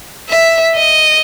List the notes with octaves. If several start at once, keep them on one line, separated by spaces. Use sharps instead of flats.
E5
D#5